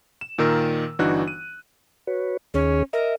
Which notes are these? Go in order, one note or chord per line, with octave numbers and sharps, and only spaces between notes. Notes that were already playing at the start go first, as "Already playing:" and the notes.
E7
A#2 D#3 A#4 E6
G1 E3 D4 D#4 F#4 F#6
D#7
F#4 B4 C#5
D#2 D#3 C#4 G#4
A#4 D#5 E5